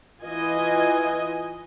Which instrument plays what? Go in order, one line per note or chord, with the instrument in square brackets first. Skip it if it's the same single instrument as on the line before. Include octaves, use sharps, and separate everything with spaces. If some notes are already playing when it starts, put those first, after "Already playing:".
[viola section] E3 F4 D#5 G#5